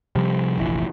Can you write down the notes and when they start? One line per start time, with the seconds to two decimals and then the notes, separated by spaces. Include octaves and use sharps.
0.15 C3 F3 G3
0.58 F1 A#1 E3